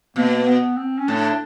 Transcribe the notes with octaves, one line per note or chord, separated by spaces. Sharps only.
B2 A#3
B3
C4
C#4
A2 D4